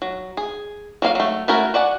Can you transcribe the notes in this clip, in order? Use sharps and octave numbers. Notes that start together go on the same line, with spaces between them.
F#3
G#4
F#3 A#3 G#4 F5
F#3 A3
A3 C#4 E4 F#4 A#4
F#4 D5 F#5 G#5